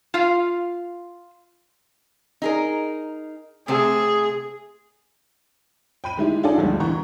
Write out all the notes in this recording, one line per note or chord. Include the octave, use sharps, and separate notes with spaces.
F4 F5
D#4 G#4 A#4
C3 A3 G#4 C5
G5 B5 D#7
D#3 G#3 E4 G4
D#4 F4 G#4 A4 D5
D2 G2 F3 G3 G#3
E3 A#5 C#6